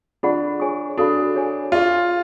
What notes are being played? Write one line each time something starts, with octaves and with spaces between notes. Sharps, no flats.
D4 F4 G#4 D5 F#5 B5
G#4 C#5 G#5 C#6
D4 F#4 A4 F5 B5
G#4 C#5 G#5
F4 G#4 D5 F5